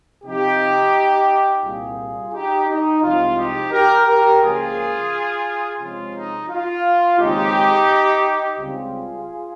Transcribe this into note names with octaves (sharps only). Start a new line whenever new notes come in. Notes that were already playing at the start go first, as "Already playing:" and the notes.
C3 F3 C4 D#4 G4
C2 A#2 G3 F4 G#4
D#4 G4
D#4
C2 C3 F3 G#3 F4
D#4 G4
G4 A#4
G4 A#4
C#2 C#3 F3 A#3 C#4 F4 G#4
C3 F3 G#3 C#4 F4
D#4
F4
D#2 C#3 G#3 C4 D#4 G4
C#2 C#3 G3 C4 F4 G#4